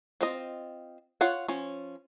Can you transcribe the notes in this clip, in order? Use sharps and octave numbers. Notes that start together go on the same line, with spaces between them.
C4 F4 D#5
F4 C#5 F5 F#5
F3 C#4